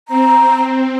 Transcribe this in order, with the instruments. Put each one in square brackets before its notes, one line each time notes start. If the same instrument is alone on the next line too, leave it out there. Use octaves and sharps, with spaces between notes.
[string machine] C4 [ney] A#5